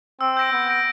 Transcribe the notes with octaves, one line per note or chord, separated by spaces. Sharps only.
C4 E6
G6 A#6 D7
B3 E6
G6 A#6 D7